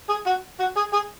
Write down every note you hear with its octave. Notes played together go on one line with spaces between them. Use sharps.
G#4
F#4
F#4
G#4
G#4